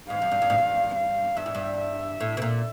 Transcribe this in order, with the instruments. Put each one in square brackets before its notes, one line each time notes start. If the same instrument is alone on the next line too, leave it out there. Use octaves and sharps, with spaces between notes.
[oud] G#2 [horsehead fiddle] F5
[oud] F#2
G2
G2
G#2
G2
[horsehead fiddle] F5
[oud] G2 [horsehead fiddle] E5
[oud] G#2
G2
[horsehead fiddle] E5
[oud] A2
B2
A#2